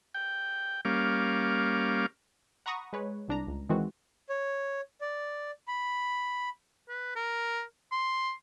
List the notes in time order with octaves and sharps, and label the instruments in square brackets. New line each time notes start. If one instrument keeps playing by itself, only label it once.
[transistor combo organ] G5
G3 A#3 C#4 F5 D6
[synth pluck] F#5 A#5 B5 C#6 D#6 A#6
G#3 B4 C#5
C2 D4 A#5
C#2
D#3 E3 G#3 C4 F#4
[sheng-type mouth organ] C#5
D5
B5
[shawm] B4
A#4
C6